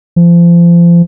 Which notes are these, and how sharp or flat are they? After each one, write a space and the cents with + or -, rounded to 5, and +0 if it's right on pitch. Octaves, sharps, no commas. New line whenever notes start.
F3 -30